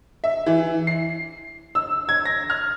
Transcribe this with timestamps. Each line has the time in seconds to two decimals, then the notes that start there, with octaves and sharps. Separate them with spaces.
0.24 E5
0.46 E3
0.87 C7
1.75 E6
2.09 G#6
2.25 A#6
2.50 F6